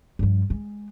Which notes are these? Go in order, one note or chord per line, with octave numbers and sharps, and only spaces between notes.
G2 F3
G#3